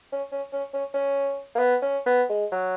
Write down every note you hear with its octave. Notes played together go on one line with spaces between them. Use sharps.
C#4
C#4
C#4
C#4
C#4
A#3
B3
C#4
B3
G#3
F#3